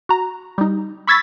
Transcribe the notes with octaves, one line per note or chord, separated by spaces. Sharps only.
F#4 A#5
G3 D#4
B5 C#6 E6 G#6 A6 B6